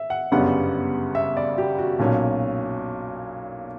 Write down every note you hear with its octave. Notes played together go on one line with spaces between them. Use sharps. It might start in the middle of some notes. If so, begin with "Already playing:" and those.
Already playing: E5
F#5
G1 F#2 C#3 G3 B3 F#5
E5
D5
G4
F#4
B1 A#2 F#3 C#4